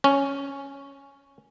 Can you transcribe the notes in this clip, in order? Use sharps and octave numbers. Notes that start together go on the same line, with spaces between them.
C#4